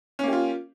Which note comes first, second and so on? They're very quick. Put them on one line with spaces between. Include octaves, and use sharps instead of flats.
C#4 A#3 G4 F4